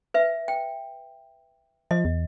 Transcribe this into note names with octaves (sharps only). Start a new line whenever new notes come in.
B4 E5
G5
F3 D#5
E2